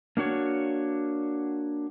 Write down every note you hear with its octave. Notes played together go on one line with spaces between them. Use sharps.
A#3 D4 F#4 C#5